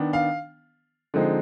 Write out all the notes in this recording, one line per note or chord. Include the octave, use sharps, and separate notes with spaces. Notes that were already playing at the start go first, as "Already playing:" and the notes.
Already playing: D#3 B3 D4
F5
D3 F3 G#3 C4 D#4